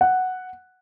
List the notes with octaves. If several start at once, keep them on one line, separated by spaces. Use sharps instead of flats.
F#5